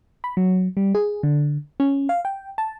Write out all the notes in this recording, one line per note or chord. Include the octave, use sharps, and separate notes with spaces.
B5
F#3
G3
G#4
D3
C#4
F5
G5
A5